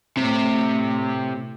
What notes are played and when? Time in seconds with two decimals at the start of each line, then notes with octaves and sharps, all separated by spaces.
0.17 A2 C3